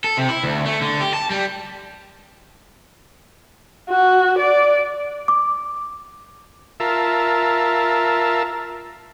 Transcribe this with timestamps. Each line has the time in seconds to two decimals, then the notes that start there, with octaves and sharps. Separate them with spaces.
0.04 A4
0.17 C3
0.29 E4
0.44 D2
0.66 A3
0.81 D3
1.01 G4
1.14 A5
1.30 G3
3.89 F#4
4.39 D5
5.28 D6
6.80 F4 A#4 E5 A5